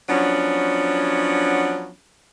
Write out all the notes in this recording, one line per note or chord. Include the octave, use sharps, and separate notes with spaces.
F3 F#3 B3 C#4 D4